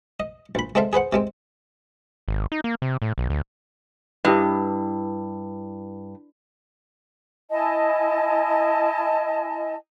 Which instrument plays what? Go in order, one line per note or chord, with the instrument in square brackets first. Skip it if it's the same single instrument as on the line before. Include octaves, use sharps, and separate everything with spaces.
[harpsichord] D#5
A#1 B5
G#3 C4 A4 E5 F5
G#4 B4 C5 F#5
C3 G#3 C4
[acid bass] G#1
D#4
A#3
C3
A2
B1
D2
[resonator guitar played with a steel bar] G2 [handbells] E4 B4 [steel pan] G4 D#5
[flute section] E4 D#5 G#5 A5